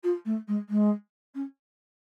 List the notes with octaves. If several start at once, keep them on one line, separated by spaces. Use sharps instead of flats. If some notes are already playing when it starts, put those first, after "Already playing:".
F4
A3
G#3
G#3
C#4